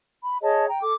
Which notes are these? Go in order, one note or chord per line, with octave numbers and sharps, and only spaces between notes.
B5
G#4 C#5 D#5 A5
G5 A#5
A4 D6